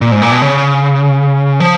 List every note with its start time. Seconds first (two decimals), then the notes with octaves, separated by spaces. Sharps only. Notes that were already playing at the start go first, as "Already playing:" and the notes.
0.01 A#2
0.12 G#2
0.22 A#2
0.32 B2
0.42 C#3
1.60 F3